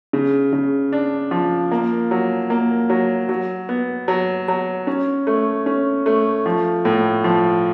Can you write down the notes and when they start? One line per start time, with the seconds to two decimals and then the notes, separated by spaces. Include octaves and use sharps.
0.13 C#3
0.53 C#3
0.93 D4
1.31 F3
1.71 A#3
2.11 F#3
2.50 A#3
2.90 F#3
3.29 F#3
3.69 B3
4.08 F#3
4.48 F#3
4.87 C#4
5.27 A3
5.66 C#4
6.06 A3
6.46 F3
6.85 A2
7.24 F3